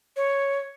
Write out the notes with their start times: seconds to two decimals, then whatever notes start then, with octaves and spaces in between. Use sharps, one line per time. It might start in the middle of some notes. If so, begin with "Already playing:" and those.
0.16 C#5